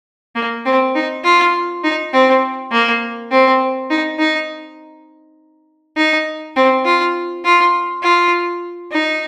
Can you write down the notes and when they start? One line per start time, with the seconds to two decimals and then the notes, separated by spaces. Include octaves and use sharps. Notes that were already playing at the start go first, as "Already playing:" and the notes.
0.35 A#3
0.65 C4
0.95 D#4
1.24 F4
1.84 D#4
2.13 C4
2.72 A#3
3.31 C4
3.90 D#4
4.19 D#4
5.97 D#4
6.56 C4
6.85 F4
7.45 F4
8.03 F4
8.92 D#4